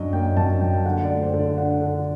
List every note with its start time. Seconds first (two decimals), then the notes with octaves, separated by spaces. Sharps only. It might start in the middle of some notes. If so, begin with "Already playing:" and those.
Already playing: F#2 F#3 D4 D5 D#5
0.13 A#3 G5
0.37 F#2 A5
0.61 F#3 G5
0.73 G5
0.85 D3 F#5
1.03 D5
1.10 A3
1.22 C5
1.34 D3
1.39 D5
1.58 D4 F#5
1.81 D3